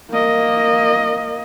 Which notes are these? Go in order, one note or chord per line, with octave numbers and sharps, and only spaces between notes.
A#3 D#5